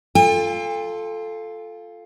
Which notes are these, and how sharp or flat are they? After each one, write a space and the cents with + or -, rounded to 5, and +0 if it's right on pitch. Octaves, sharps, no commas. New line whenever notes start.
F4 +0 A4 +0 G5 +40